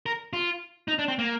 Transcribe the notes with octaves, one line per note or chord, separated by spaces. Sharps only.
A#4
F4
D#4
D4
C4
A#3